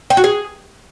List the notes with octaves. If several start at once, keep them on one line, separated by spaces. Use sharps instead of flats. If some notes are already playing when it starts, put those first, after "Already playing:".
G5
F#4
G#4